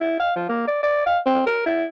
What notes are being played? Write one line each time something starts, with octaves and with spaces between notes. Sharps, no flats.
E4
F5
F3
A#3
D5
D5
F5
C4
A#4
E4